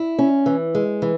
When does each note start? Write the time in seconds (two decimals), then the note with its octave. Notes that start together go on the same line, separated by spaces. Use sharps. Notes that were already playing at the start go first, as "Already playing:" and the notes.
Already playing: E4
0.19 C#4
0.46 E3
0.75 G#3
1.02 E3